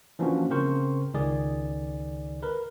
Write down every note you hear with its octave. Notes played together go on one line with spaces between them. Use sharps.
E3 F3 A#3 C#4 D4 F#4
C#3 C4 A#4 C5 C#6
C#2 D#3 G#4 D5
A#4 B4